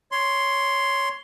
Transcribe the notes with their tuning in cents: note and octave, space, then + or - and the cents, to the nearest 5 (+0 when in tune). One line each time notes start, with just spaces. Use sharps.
C#5 +10 C6 +0